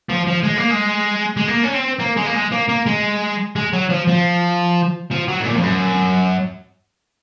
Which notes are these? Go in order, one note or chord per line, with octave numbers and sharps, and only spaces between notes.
F3
F3
G#3
A#3
G#3
G#3
A#3
C#4
C4
A#3
G#3
A#3
G#3
A#3
A#3
G#3
G#3
F#3
F3
F3
F3
F#3
G#2
A#2
F2
F#2